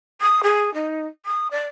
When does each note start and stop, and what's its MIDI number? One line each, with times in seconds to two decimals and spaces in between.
0.21 0.40 87
0.43 0.72 68
0.73 1.06 63
1.25 1.47 87
1.51 1.66 74